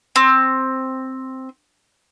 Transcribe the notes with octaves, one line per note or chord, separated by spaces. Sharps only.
C4